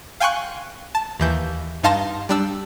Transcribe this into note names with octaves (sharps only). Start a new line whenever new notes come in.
F5 G5 G#5 C6 C#6 F#6
A5
D#2 E3 G6
G2 D#4 F5 A5 C6 A#6
G3 D4 E6